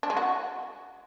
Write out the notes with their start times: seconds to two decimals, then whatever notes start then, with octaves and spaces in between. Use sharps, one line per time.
0.03 D4
0.10 G#3
0.17 F#4